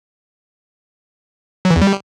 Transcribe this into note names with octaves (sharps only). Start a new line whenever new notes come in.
F#3
E3
E2
G3